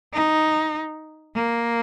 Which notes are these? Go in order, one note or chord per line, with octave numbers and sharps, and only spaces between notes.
D#4
A#3